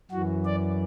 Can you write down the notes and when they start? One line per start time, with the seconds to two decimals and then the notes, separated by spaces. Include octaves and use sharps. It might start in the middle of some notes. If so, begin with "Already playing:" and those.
0.11 F#2 E3 F#4
0.45 D5